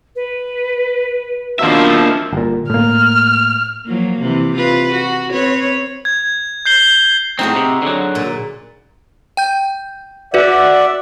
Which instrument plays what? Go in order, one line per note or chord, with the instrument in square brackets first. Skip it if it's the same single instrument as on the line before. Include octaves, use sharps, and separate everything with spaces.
[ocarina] B4
[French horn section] B2 F3 [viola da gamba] D#3 D4 F4 [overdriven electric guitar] A#3 E5
[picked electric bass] G1 A#2
[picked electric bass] A2 A#3 [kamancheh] F6
[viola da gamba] F3 F#3 A#3
C3 E3
F4 B4
F#4
C4 B4 C#5
[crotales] G#6
G6 C7 G7
[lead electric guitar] A2 C4 [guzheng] D#4 F#4 G#4
[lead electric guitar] C3
D3 F#3
[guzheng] A#2
[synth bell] G5 G6
[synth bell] F#4 B4 [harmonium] D5 E5 F#5